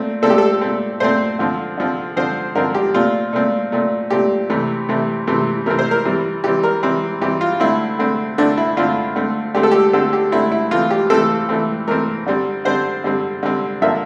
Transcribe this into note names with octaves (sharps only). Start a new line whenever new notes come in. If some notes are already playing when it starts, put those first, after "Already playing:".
Already playing: A#2 A3 C4
A#2 A3 C4 A4
G4
A4
A#2 A3 C4
A#2 A3 C4 C5
D3 F3 C4
D3 F3 C4
D3 F3 C4 C5
D3 F3 C4 A#4
G4
A#2 A3 C4 F4
A#2 A3 C4
A#2 A3 C4
A#2 A3 C4 G4
C3 E3 A3 C4
C3 E3 A3 C4
C3 E3 A3 C4
C3 E3 A3 C4 A#4
C5
A#4
E3 G3 C4
E3 G3 C4 G4
A#4
E3 G3 C4
E3 G3 C4 G4
F4
D3 A3 C4 E4
D3 A3 C4
D3 A3 C4 D4
E4
D3 A3 C4 F4
D3 A3 C4
D3 A3 C4 G4
A4
G4
D3 A3 C4 A4
G4
D3 A3 C4 E4
E4
E3 A3 C4 F4
G4
E3 A3 C4 A4
E3 A3 C4
E3 A3 C4 A#4
D3 G3 C4
D3 G3 C4 C5
D3 G3 C4
D3 G3 C4
D3 F3 A#3 E5